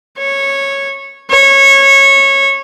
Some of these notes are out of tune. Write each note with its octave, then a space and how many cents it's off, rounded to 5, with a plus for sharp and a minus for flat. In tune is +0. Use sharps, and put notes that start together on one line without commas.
C#5 -10
C#5 -15